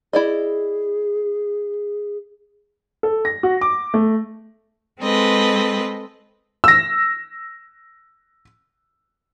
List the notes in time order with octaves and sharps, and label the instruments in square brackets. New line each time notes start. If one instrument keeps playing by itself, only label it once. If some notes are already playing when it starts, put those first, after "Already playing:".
[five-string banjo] E4 D5 D#5 [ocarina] G#4
[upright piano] A4
A#6
F#4
D6
A3
[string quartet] G#3 C4 A4 B4 D#5
[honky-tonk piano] E6 A#6